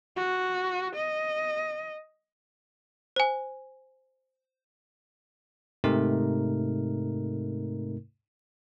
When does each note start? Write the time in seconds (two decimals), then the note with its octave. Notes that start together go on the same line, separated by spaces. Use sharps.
0.17 F#4
0.95 D#5
3.16 C5 G#5
5.84 G#2 C3 A3 D#4 A#4